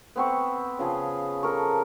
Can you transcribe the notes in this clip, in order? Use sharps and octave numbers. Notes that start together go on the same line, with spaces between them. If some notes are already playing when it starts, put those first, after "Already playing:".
B3 C4 C#6
C#3 F3 G#4
A4 A#4 C#6